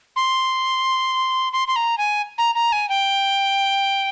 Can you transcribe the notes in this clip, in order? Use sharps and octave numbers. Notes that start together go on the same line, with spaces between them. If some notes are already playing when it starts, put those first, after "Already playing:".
C6
C6
C6
A#5
G#5
A#5
A#5
G#5
G5